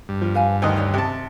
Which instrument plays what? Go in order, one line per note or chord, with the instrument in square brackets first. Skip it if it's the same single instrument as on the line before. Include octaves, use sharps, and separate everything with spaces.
[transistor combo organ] G2
[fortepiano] F3
[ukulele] B4 F5 G#5
[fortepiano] D2 D#3 D#5 [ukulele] C5
[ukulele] D#4 C#5 D5
[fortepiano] C3 A5 [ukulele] C#4